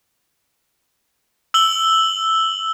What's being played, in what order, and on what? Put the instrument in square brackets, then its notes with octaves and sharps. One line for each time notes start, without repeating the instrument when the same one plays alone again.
[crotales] E6 F#7 G7